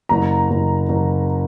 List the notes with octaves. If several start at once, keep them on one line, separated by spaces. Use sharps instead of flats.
F#1 A#5
F#1
F#1